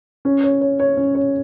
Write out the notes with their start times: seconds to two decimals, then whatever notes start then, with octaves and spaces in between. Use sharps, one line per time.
0.25 C#4
0.44 C#5
0.61 C#5
0.80 C#5
0.97 C#4
1.15 C#5